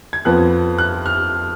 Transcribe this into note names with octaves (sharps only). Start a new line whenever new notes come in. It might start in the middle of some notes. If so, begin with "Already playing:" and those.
G#6
F2 F3 B3 F#6
F#6
F6